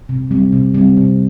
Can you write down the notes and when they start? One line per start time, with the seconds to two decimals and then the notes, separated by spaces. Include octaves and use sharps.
0.09 C3
0.31 G3 C4
0.53 C3
0.74 G3 C4
0.97 C3